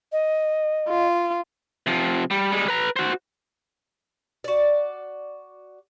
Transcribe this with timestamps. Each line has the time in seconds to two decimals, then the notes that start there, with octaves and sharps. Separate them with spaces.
0.12 D#5
0.89 F4
1.87 C3 F3
2.31 G3
2.52 G3 G#3
2.68 B4 A#5
2.96 F#4 C5
4.44 F#4 D5